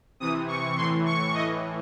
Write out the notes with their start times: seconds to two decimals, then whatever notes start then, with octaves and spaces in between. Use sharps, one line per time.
0.20 C3 E3 D#6
0.48 C#6
0.77 A2 E3 C6
1.05 C#6
1.34 A2 E3 D#5